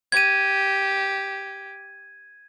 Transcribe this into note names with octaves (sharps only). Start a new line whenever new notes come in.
G4 G#6 D#7